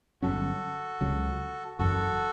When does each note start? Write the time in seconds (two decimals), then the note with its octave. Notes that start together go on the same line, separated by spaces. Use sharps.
0.22 G1 G2 F#3 C#4 F#4 A4
1.01 C#2 C#3 F#3
1.79 F#1 F#2 E3 F#4 A4